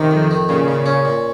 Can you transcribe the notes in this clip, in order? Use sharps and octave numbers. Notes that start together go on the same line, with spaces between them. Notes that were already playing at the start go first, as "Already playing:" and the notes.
Already playing: C3 D#3
F2
D#3
A#2 C#3
A#2
C#4
A#2